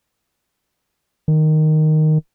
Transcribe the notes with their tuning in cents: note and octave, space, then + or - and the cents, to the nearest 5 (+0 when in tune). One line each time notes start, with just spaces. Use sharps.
D#3 -5